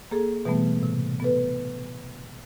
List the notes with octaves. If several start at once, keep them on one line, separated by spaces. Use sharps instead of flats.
A#3 G#4 A4
B2 E3 G3 A3 B3
A2 C3
B3 A4 B4